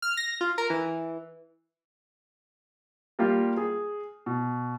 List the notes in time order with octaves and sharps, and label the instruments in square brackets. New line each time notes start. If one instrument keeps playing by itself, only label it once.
[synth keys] F6
A#6
F4
A#4
E3
[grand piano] G3 A#3 F4 G4
G#4
B2